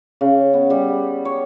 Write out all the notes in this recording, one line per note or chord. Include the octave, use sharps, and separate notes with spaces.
C#3
B3
G3
C#5